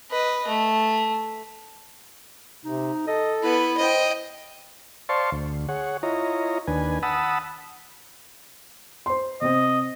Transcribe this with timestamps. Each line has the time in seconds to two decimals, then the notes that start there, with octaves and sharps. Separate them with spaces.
0.11 B4 D#5
0.48 A3
2.65 C3 D#4
3.07 A4 D#5
3.43 B3 E4 B4
3.77 C5 D#5 G5
5.09 C5 D5 F5 A5 C6 C#6
5.32 D2
5.69 G#4 C#5 F#5
6.03 E4 F4 C#5 D#5 A#5
6.67 D#2 D4 B4 G#5
7.03 F#5 A5 B5 D#6 E6
9.06 C5 C6
9.41 C3 C4 D#5